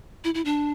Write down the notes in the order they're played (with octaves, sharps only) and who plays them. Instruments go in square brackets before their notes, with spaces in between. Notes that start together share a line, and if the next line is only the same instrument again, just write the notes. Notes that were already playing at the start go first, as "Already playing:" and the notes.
[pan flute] E4
E4
D4